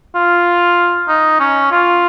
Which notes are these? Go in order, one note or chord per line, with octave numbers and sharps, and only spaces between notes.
F4
D#4
C#4
F4